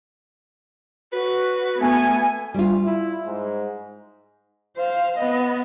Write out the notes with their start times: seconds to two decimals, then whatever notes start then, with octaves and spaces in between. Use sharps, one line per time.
1.13 F#4 B4
1.80 A3 B3 G#5
2.54 D2 G3 F4
2.85 E4
3.26 G#2
4.76 C5 F5
5.18 B3 D#5